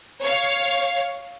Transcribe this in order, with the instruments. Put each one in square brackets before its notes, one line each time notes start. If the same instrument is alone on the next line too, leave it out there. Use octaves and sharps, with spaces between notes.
[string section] C#5 F5